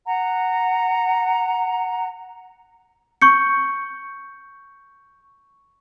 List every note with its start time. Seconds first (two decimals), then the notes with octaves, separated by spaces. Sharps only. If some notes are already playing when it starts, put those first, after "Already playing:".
0.06 F#5 A#5
3.22 C#6 G6 C#7